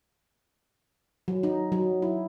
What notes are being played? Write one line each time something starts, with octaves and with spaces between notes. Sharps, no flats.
F#3
D#4
F#3
E4